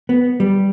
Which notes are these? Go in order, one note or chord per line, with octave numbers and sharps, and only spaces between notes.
B3
G3